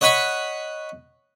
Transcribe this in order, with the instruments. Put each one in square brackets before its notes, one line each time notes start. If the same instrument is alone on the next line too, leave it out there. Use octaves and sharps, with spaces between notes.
[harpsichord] C#5 D#5 F#5 B5 C#6